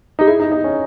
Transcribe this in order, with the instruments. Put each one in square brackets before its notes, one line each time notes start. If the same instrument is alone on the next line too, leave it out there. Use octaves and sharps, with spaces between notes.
[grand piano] D#4 [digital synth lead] G4
[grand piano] E4 [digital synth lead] G#4
[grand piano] D#4
D#4
C#4